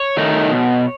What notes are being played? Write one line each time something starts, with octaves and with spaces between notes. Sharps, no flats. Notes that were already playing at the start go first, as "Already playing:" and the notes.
Already playing: C#5
D#3 A3 D#4
B2